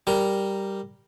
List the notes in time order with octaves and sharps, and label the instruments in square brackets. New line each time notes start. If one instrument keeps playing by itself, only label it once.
[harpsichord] G3 A#4